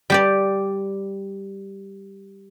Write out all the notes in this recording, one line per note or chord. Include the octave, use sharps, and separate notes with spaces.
G3 G4 D5